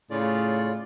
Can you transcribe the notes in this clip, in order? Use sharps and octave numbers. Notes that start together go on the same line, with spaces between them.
A2 C#3 F4 D5